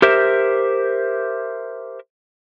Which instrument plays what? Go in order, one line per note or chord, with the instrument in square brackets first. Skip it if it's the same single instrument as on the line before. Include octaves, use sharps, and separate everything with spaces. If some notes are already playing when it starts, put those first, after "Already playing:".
[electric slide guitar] G4 A#4 C5 E5